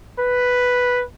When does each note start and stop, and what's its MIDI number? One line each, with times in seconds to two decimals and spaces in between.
0.19 1.03 71